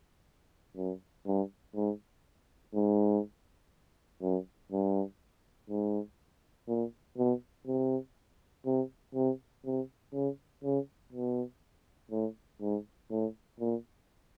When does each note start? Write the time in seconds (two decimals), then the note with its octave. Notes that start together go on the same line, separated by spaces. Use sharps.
0.76 F#2
1.26 G2
1.75 G#2
2.74 G#2
4.22 F#2
4.72 G2
5.69 G#2
6.68 A#2
7.18 B2
7.67 C3
8.66 C3
9.15 C3
9.65 C3
10.14 C#3
10.64 C#3
11.12 B2
12.11 A2
12.61 G#2
13.10 A2
13.59 A#2